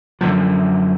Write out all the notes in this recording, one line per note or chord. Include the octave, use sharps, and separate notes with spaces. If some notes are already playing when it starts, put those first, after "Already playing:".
F#2 D3 F3